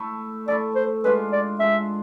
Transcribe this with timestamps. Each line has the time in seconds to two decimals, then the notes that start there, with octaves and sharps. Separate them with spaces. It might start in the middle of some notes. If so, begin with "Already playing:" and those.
Already playing: A3 E4 A4
0.48 A3 E4 A4 D5
0.75 C5
1.04 G#3 D4 F4 B4
1.32 D5
1.59 G#3 D4 F4 E5